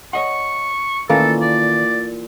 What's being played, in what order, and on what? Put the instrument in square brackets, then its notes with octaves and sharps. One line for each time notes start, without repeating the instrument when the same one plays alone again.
[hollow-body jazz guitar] C#5 D#5 F#5 [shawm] C#6
[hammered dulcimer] A#2 [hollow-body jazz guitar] D#3 C#4 [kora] E3 A3 A#3 [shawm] A4
[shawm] D5